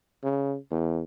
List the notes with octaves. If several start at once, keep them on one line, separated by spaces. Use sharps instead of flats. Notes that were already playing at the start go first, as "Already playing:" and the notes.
C#3
E2